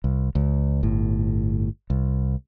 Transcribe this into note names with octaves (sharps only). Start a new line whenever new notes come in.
C2
C#2
G1 A2
C2